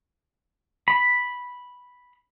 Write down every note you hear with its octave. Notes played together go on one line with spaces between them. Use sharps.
B5